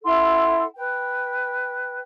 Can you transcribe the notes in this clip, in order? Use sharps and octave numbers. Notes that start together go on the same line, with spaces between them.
E4 A4 F#5 C6
B4 G5